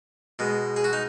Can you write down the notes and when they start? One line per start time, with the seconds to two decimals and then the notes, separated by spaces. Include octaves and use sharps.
0.39 B2 G#3
0.76 G#4
0.84 F#4
0.93 D#4